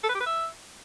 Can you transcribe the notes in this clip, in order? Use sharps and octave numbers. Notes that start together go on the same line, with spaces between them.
A4
B4
G4
B4
E5